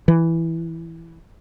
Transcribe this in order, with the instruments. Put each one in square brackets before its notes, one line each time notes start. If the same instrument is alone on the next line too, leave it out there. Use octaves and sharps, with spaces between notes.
[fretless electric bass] E3